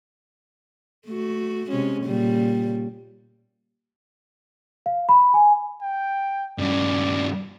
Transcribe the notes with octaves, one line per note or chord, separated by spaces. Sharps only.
A3 F#4
C3 G#3 C#4
A#2 C#3 G3
F5
B5
G#5
G5
G2 C#3 D5